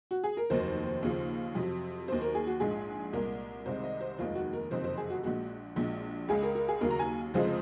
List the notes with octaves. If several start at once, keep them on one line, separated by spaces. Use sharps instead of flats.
F#4
G#4
A#4
F1 D#2 D#3 F#3 C5
D#2 C#3 F3
F2 C3 F#3
D#2 D#3 F#3 C5
A#4
G#4
F#4
A#1 G#2 F3 G#3 G#4
C2 A#2 G#3 A#4
C2 C3 D#3 G#3 C5
D#5
C5
F1 D#2 D#3 G#3 F4
F#4
A#4
F#1 F2 C3 D#3 C5
C5
G#4
F#4
A#1 A#2 G#3 F#4
A#1 A#2 G#3
C#2 C#3 G#3 G#4
A#4
A#4
G#4
D#2 C#3 F#3 A#4
A#5
G#5
F1 F2 C#3 F3 G#3 C5